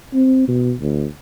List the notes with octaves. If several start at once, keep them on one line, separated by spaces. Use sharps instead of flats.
C4
B2
D2